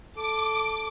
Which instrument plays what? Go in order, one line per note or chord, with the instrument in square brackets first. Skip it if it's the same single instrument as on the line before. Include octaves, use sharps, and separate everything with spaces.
[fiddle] A4 [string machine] D6